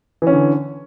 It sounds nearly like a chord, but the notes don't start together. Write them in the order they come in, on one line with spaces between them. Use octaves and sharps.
E3 C#4 D3